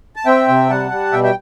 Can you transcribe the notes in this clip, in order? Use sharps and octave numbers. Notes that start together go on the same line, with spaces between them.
A5
C4 E5 G5
C3
G3 F#5 A5
G3
B2 E5 G5
E5 G5